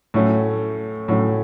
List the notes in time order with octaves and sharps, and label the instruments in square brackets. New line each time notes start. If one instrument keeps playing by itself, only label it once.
[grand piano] A2 F#3 A3 C#4
A2 F#3 A3 C#4